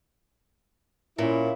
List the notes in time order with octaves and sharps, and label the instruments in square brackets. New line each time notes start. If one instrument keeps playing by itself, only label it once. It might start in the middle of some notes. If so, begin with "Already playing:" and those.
[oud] A#2 [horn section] C#4 E4